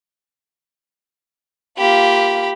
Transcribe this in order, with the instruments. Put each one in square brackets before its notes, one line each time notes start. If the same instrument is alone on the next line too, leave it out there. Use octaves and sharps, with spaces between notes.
[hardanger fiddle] A#3 F4 [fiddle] G4 B5